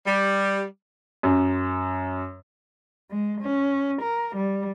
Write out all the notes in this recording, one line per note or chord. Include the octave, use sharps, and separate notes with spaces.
G3
F#2
G#3
C#4
A#4
G3